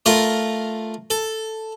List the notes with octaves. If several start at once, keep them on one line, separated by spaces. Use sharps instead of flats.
A3 F4 A#4 A#5
A4